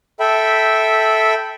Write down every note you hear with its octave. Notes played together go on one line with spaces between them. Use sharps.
A4 E5 G5 B5